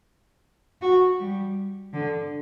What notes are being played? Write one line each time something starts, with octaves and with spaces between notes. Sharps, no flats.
F#4
G3
D3